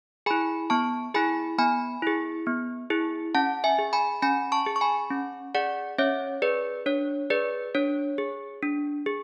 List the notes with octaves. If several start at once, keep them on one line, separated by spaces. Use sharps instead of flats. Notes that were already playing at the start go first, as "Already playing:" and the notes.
E4 G#4 G#5 B5
B3 A5 C#6
E4 G#4 G#5 B5
B3 G#5 B5
E4 G#4
B3
E4 G#4
C#4 F#5 A5
E5 G#5
G#4
G#5 B5
C#4 G#5 B5
A5 C#6
G#4
C#6
G#5 B5
C#4
G#4 D5 F#5
C#4 C#5 E5
G#4 B4 D5
D4 C#5
G#4 B4 D5
D4 C#5
G#4
D4
G#4